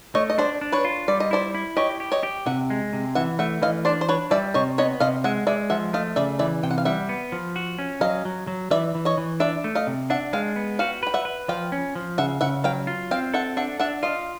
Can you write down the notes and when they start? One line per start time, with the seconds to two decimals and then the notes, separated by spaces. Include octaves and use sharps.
0.15 A3 C#5 D#5
0.30 D#5
0.38 D4 C5 D5
0.61 D4
0.72 B4 C#5
0.85 F4
1.08 G3 D5
1.20 D#5
1.31 E4 C5 D5
1.55 E4
1.77 G4 C#5 D#5
2.00 G4
2.12 C#5 D#5
2.23 G4
2.46 C3 E5 F#5
2.70 G#3
2.93 C3
3.15 E3 E5 F#5
3.39 A3 E5 F#5
3.62 E3 D#5 F5
3.85 D4 C5 D5
4.01 C5
4.09 D4 B4 C#5
4.31 G3 D5 E5
4.54 C3 C#5 D#5
4.78 B3 C#5 D#5
5.00 C3 D#5 F5
5.24 G#3 E5 F#5
5.47 G#3 D5 E5
5.70 F3 E5 F#5
5.93 A3 D#5 F5
6.16 C#3 D5 E5
6.39 E3 D5 E5
6.63 C3 G5
6.71 F#5
6.78 F5
6.85 G3 E5 F#5
7.09 B3
7.32 F3
7.56 F#4
7.79 C#4
8.01 F#3 D#5 F5
8.25 F#3
8.47 F#3
8.71 E3 D5 E5
8.95 E3
9.05 C#5 D#5
9.18 E3
9.40 D4 D5 E5
9.64 A3
9.75 D#5 F5
9.87 C3
10.10 D4 E5 F#5
10.33 G#3 F5 G5
10.56 B3
10.79 F#4 F5 G5
11.03 B4 G5
11.14 E5 F#5
11.25 B4
11.48 F3 F5 G5
11.72 C#4
11.95 F3
12.18 C#3 E5 F#5
12.41 C#3 E5 F#5
12.64 F#3 F5 G5
12.87 F4
13.11 C4 F5 G5
13.34 A4 E5 F#5
13.57 D4 E5 F#5
13.80 D4 E5 F#5
14.03 F4 D#5 F5